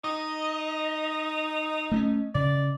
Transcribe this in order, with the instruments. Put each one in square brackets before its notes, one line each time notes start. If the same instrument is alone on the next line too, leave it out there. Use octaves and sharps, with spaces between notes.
[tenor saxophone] D#4 [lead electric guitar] D#5
[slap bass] A3 C4 C#4
[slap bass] C#3 [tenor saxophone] D5